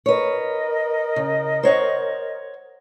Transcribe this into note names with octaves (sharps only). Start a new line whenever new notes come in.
A#4 B4 C#5 D#5
C#3
C5 C#5 F#5